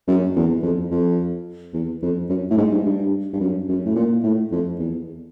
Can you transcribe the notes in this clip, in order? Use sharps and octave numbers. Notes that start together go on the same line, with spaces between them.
F#2
E2
F2
F2
E2
F2
F#2
A2
G#2
G2
G2
G2
F#2
F#2
A2
A#2
A2
F2
E2